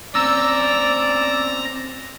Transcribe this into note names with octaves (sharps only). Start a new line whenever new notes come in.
C4 C#4 D5 A#5 E6